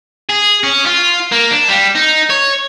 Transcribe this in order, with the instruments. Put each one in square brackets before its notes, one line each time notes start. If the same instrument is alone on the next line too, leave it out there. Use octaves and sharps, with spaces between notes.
[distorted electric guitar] G#4
C#4
F4
A#3
D4
G3
D#4
C#5